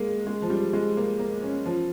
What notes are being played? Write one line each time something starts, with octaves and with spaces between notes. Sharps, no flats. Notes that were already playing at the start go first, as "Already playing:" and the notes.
Already playing: G#3 A#3
G#3
F3
G3
G#3
A#3
A#3
C#4
F3